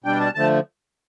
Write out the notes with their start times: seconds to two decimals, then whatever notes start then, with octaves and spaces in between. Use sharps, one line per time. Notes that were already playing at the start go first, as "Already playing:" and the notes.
0.04 B2 G3 D4 G5
0.20 A5
0.35 D3 F3 A3 A5